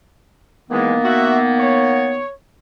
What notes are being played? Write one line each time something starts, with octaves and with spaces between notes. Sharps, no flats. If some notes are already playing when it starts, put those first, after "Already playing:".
D#3 E3 G#3 A#3 B3
F#4 E5
C#5